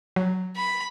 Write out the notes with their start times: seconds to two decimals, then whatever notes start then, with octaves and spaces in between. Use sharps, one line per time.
0.16 F#3
0.56 B5